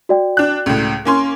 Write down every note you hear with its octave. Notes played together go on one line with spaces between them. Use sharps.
F#4 D5 G5
D4 F#6
C#2 A2
A#3 C#4 C6